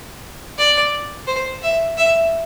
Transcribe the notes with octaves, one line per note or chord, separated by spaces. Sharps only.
D5
C5
E5
E5